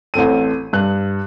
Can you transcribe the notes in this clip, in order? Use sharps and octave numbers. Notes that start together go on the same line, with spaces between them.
A1 C4 A4 D#7
G2 F#6